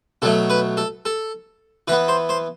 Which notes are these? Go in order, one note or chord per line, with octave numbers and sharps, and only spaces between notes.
B2 F#3 A3 A4
B4
A4
A4
E3 B3 B4
C5
C5